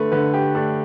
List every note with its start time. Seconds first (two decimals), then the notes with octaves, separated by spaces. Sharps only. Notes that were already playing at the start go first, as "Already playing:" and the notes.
Already playing: D3 A3 B4
0.12 D3 B4
0.34 G4
0.55 A3 D4